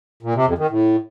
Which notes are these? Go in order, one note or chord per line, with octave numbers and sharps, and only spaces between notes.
A#2
C3
F2
D#3
A2